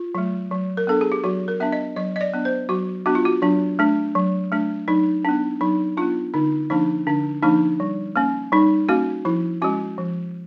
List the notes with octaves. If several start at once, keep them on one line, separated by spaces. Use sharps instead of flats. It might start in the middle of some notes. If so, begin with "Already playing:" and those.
Already playing: F4
F#3 A3
F#3
A#4
B3 D4 A4
G#4
G4
F#3 F#4
A#4
B3 D4 E5
D#5
F#3 D#5
D#5
D5
B3 D4
C5
F#3 F#4
B3 D4 F#4
F4
F#4
F#3 D4
A3 D4
F#3
A3 D4
F#3 D#4
B3 D4
F#3 D#4
B3 D4 F4
D3 D#4
F3 A#3 D4 D#4
D3 D4
F3 A#3 D4 D#4
G3
A#3 C#4
G3 D#4
A#3 C#4 F#4
F3 E4
G#3 C#4 F#4
F3